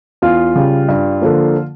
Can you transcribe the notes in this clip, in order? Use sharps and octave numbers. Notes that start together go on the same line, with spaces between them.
E2 F4
C#3 G3
G2
D3 F3 A#3